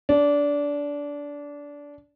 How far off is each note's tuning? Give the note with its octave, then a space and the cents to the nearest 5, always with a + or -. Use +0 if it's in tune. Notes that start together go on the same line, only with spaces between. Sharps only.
D4 -20